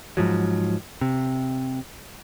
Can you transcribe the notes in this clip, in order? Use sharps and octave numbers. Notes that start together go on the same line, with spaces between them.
G#2 F3 F#3
C3